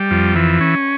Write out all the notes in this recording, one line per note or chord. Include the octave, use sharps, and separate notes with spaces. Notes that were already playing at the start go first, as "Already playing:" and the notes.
Already playing: G3
F2
E3
C#4